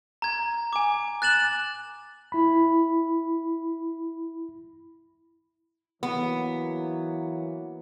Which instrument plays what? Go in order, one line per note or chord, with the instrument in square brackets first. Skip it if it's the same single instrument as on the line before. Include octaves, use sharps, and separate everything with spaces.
[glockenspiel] A#5 G#6
G#5 D6
F#6 A6 E7 F#7
[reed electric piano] E4 B5
[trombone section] E3 F#3 A#3 [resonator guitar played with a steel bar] B3